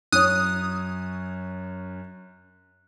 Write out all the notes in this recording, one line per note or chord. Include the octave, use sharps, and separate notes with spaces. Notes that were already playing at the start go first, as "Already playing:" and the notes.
F#2 C#5 D#6 F#6